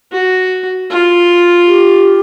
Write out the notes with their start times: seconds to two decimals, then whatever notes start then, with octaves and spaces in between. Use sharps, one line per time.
0.12 F#4
0.90 F4
1.67 G4